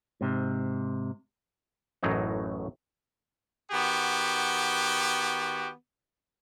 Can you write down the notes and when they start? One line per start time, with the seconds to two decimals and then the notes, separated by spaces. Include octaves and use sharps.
0.21 G#2 C3
2.03 A1 F#2 A2 E3 F#3 D#4
3.72 D#3 B3 F#4 G4